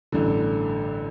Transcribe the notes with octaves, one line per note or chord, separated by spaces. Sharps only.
A1 G2 D3